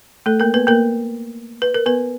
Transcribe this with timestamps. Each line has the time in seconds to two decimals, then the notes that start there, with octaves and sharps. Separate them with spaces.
0.26 A3 A4
0.40 A#3 A#4
0.54 B3 B4
0.67 A#3 A#4
1.62 B4
1.74 A#4
1.86 B3 B4